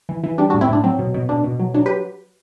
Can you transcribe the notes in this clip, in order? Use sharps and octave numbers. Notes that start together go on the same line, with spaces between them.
E3
E3
G3 D4
D4 F#4
A2
C4 E4
A2 D4
F#3 C4
B2
B2
B2 D4
B2
F#3
F#3 D4
G4 B4